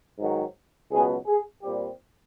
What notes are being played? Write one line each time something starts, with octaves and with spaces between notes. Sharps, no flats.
G#2 D#3 F#3
C#2 B2 F#3 B3 G#4
G#4
A#2 G3 C4 G4